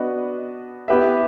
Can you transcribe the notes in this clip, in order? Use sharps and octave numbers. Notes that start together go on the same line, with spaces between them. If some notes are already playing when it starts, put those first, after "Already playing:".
Already playing: B3 D4 F#4 B4 D#5
B3 E4 G4 B4 E5